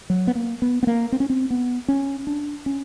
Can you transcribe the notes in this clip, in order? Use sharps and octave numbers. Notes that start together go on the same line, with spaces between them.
F#3
B3
A#3
B3
B3
A#3
C4
C#4
C4
B3
C#4
D4
C#4